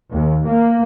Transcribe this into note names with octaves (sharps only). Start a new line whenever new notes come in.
D#2
A#3